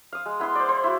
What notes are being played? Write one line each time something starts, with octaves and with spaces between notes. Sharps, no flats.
F5 D#6
G#3
B3 E4 F5 C6
C5 D5
C5
E4 F#4